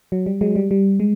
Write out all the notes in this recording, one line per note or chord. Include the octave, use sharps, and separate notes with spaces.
F#3
G3
F#3 G#3
G3
G3
G#3